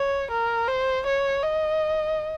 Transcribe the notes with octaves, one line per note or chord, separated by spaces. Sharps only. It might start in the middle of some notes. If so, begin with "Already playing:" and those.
Already playing: C#5
A#4
C5
C#5
D#5